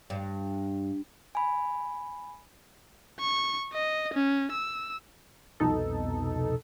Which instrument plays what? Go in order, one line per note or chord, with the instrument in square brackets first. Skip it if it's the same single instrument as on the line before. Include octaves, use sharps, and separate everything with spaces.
[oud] G2
[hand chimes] G#5 B5
[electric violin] C#6
D#5
C#4
E6
[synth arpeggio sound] C2 F2 B2 D#4 A4